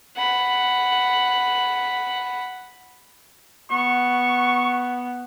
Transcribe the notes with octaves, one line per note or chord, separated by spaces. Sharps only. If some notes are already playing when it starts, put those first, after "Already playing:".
F#5 B5
B3 C#6